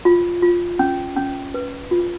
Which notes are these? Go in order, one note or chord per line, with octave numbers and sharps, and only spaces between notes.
F4
F4
C#4
C#4
B4
F4